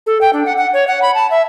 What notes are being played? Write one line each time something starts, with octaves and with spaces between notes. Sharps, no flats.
A4
G5
D4
F#5
F#5
C#5
F#5
B5
A5
E5